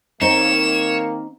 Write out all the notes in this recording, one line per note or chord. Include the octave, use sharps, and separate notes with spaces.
D#3 A#3 C4 D#4 C#5 E7